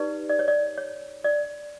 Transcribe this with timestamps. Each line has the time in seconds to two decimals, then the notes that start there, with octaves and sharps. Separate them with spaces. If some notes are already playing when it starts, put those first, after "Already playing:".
Already playing: D#4 G4 B4 D5
0.29 D5
0.39 C#5
0.48 D5
0.78 C#5
1.24 D5